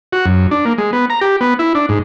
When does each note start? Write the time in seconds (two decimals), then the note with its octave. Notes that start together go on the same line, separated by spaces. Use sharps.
0.13 F#4
0.26 F#2
0.51 D4
0.65 A#3
0.78 G#3
0.93 B3
1.10 A#5
1.21 G4
1.41 B3
1.59 E4
1.75 D4
1.89 G#2